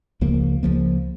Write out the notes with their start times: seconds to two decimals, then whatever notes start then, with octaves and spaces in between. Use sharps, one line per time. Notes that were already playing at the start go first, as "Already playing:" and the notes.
0.21 C#2 C#3 F3 A#3
0.63 C#2 C#3 F3 A#3